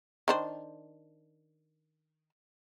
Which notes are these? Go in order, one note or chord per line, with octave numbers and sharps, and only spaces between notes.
D#3 D4 C5